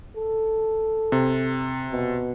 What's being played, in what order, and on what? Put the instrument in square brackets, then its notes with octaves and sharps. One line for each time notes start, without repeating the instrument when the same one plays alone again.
[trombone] A4
[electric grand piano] C3
[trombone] B2